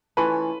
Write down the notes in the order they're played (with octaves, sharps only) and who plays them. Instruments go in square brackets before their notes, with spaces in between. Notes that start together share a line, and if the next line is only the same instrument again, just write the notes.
[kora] E3 A3 C#4 F4 [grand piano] B4